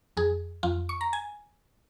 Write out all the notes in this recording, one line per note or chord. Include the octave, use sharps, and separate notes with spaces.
F2 G#4
F2 F4
C#6
A#5
G#5